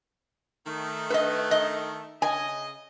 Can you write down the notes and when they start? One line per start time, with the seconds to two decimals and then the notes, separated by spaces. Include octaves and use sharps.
0.66 D#3 A3
1.10 B4 D#5
1.51 D#5
2.22 C#3 D#5 G#5